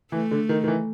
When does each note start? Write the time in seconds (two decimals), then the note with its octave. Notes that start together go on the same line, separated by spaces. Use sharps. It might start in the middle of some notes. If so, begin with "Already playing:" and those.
0.12 E3 A3
0.31 D3
0.49 D#3
0.64 D#3
0.68 E3